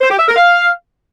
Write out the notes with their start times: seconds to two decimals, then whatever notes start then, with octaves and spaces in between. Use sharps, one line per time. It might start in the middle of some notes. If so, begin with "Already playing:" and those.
0.01 C5
0.10 G4
0.19 E5
0.27 A#4
0.36 F5